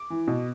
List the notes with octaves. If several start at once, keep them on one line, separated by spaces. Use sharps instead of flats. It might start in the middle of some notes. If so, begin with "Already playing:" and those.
Already playing: D6
E3
B2